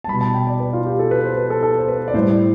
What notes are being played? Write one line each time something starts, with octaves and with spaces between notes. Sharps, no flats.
A5
B2 G3 B5
A5
G5
D5
B4
F4
G4
A4
B4
C5
B4
A4
A4
C5
B4
D5
A2 G3 C5